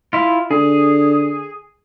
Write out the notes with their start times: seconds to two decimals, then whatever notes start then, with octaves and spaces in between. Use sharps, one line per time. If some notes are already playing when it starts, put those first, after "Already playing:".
0.13 E4 F4
0.51 D3 G#4